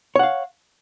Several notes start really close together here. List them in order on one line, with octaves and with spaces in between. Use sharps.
C#5 F#5 F5